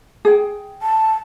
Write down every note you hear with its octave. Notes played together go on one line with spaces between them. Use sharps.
G#4 G5
A5